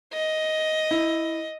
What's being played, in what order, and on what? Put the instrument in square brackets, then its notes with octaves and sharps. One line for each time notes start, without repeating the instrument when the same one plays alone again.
[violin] D#5
[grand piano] E4